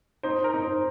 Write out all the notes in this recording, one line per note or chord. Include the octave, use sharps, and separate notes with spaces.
D#4 C5
A#4
D#4
C5